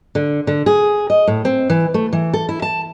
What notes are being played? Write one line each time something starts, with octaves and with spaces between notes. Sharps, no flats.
D3
D3
G#4
D#5
A2
C4
E3
A3
E3
A4
E4
A5